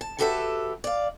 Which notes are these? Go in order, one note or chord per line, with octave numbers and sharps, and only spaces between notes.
A5
E4 F#4 G4 A4 B4 E5
D5 F5